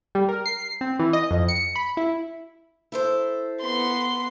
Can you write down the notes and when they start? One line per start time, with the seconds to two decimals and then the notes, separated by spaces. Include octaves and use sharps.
0.15 G3
0.29 A#4
0.46 C7
0.81 C4
0.99 E3
1.13 D#5
1.31 F2
1.49 C#7
1.76 B5
1.97 E4
2.92 E4 A4 C5
3.61 B3 C6